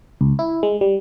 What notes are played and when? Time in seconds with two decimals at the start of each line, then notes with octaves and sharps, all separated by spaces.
0.21 C#2
0.39 E4
0.63 G#3
0.81 G3